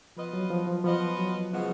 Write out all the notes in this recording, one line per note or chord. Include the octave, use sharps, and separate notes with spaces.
F3 B3 F4 B4 D#5
F#3
F3
F3
F3 B3 F4 B4 D#5
F#3
C#3 F3 G#3 B3 F#4